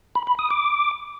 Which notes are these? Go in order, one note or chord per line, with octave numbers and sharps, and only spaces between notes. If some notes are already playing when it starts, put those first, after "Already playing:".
B5
B5
D#6
D6